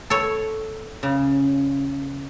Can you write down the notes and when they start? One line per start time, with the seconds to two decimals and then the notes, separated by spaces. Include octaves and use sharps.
0.10 A4 C#5
1.03 C#3